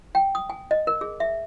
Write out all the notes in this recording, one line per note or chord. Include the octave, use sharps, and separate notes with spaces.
G5
D#6
G#5
D#5
A#4
G#4
E5